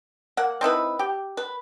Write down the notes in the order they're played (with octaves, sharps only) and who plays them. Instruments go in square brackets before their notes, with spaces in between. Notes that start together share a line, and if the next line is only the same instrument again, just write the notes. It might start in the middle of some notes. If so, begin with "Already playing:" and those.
[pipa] A#3 F#5
C4 D#4 E4 B4
G4
B4